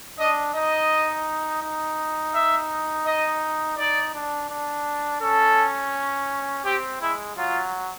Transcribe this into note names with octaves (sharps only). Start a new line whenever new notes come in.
D4 D#5
D#4 D#5
D#4
E5
D#5
D#4 D5
D4
D4
C#4 A4
C4 G4
G#3 E4
F#3 F4